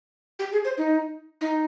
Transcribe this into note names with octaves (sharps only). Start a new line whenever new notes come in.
G4
G#4
C5
D#4
D#4